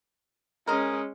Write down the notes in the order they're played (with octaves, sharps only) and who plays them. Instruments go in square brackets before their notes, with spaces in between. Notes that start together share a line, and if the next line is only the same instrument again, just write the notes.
[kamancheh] G#3 C#4 [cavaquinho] A#4 D#5